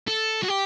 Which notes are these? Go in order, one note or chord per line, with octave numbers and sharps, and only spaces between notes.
A4
F#4
G4